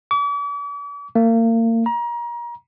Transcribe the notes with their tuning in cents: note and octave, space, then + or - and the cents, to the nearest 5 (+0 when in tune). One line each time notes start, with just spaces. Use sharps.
D6 -45
A#3 -35
A#5 +30